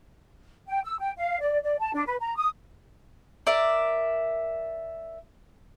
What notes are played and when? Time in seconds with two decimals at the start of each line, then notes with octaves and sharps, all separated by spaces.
0.68 G5
0.84 E6
1.00 G5
1.17 F5
1.41 D5
1.62 D5
1.80 A5
1.94 D4
2.06 B4
2.21 A#5
2.37 D#6
3.47 A#4 D5 E5